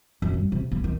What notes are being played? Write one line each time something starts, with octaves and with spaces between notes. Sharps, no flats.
F#2
G2
C3
B3
D#3